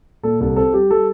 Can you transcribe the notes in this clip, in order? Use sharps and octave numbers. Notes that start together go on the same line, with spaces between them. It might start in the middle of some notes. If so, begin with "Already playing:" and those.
A#2 A4
C2 A4
C4 A4
G3 G4
G3 A4